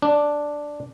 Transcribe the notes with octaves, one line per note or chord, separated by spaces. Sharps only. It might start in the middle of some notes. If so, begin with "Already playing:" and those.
D4